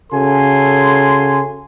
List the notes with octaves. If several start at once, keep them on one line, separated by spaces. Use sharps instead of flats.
C#3 F#4 A4 G#5 C6